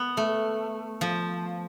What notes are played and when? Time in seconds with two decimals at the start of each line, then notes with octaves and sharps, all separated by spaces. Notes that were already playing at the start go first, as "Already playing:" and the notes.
Already playing: B3
0.17 A3
1.01 F3